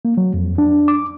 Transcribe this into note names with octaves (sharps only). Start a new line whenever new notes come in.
A#3
F#3
F2
D4
D6